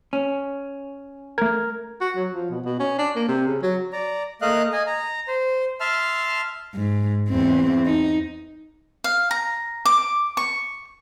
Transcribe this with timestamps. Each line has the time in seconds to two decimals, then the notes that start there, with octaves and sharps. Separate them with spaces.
0.13 C#4
1.38 A3 A#4 G#6
2.01 F#4
2.16 F#3
2.32 F3
2.50 B2
2.65 B2
2.80 C#4
2.99 D4
3.16 A#3
3.28 C3
3.47 C#3
3.62 F#3
3.93 D5 A#5
4.42 A3 A#3 D#5 F5 F#6
4.73 D#5 G#5
4.87 A#5
5.28 C5
5.80 E5 A5 C6 F6
6.75 G#2
7.29 E2 C4
7.86 D#4
9.04 F5
9.31 A#5
9.85 D6
10.37 C#6